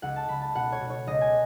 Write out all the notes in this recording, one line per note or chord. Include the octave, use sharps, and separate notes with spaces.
C#2 F#5
A5
C#2 B5
A5
B2 F#5
C#5
B2
C#5
C#2 D#5
G#5